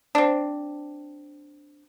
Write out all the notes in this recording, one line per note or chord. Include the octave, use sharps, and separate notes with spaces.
C4 D4